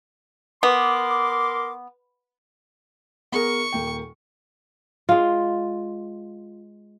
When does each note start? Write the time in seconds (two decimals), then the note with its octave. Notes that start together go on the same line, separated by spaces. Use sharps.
0.63 B3 A#4 C6 D6
3.32 B3 G#4 A#4 C#6
3.73 D#1 A#3 G5
5.09 G#3 F4